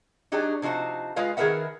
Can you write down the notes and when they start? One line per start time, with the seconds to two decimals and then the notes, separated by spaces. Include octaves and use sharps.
0.32 F#3 D4 D#4 G4 G#4
0.62 C3 F3 D#4 F#4 C5
1.16 G#3 F4 B4 D#5 F5
1.37 D#3 G#4 A#4 B4 E5 F#5